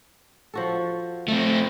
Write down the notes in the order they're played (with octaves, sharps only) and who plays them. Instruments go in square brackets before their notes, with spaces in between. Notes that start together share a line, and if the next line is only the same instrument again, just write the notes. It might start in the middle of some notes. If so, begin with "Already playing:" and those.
[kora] F3 F#4 A4
[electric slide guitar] A3 C4